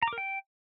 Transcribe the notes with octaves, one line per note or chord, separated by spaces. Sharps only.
A#5
D6
A#4
G5